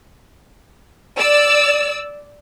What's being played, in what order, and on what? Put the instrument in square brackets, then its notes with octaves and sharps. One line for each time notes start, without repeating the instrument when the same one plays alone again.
[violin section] D5 E6